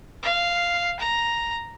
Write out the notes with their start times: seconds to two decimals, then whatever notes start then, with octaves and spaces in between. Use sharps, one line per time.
0.23 F5
1.00 A#5